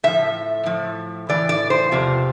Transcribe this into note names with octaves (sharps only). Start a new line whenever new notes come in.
A2 F3 E5
A2 F3
A2 E3 D5
D5
C5
E2 C3 F3